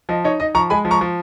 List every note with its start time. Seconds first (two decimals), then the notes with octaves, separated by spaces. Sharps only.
0.09 F3 D#5
0.24 D#4 C#5
0.40 D#4 D#5
0.55 F3 A#5 C#6
0.70 G#3 G#5 B5
0.85 F3
0.91 A#5 C#6
1.01 F3